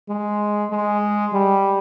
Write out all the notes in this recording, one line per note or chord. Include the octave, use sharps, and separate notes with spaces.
G#3
G#3
G3